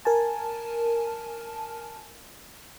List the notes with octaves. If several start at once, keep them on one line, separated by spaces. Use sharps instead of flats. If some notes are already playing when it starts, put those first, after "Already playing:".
A#4 G#5 A5